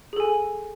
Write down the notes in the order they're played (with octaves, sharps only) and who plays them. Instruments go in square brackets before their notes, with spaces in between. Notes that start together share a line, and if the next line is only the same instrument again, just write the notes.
[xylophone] G#4
A4
G#5